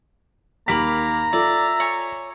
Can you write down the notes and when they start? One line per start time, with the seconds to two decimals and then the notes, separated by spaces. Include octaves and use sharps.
0.68 D#2 A#3 G4 A#4 A#5 B5 B6
1.33 F4 A4 D5 E5
1.80 C#5 G#5